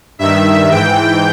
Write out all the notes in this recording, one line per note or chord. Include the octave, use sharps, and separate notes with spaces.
G2 D#3 E5
G#2 E3 G5